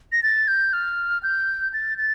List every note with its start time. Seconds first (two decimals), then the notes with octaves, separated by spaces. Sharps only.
0.12 A#6
0.23 A6
0.48 G6
0.73 F6
1.23 G6
1.74 A6
1.98 A6